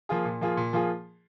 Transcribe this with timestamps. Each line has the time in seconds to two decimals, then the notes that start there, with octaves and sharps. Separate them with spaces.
0.09 F3 A#3 F4 G#4
0.25 A#2
0.41 F3 A#3 F4 G#4
0.57 A#2
0.73 F3 A#3 F4 G#4